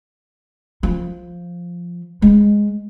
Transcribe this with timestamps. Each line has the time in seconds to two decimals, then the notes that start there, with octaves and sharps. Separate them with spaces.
0.83 F3
2.22 G#3